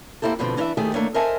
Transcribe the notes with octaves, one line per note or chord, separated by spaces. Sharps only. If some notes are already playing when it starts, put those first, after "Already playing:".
A#3 C4 E4 G4 A4
G2 B2 D3 F3 C4
E3 C#4 D4 E4 E5
D#2 D#3 A3 G4 G#4
D#3 A3 A#3 D4 C#5
A#4 C5 D#5 E5 G#5 A5